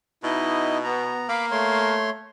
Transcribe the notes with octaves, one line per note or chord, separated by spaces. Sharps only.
B2 D#4 E4 D#5
B3 A#5
A#3 F5 B5 D6
A3 C#5 C6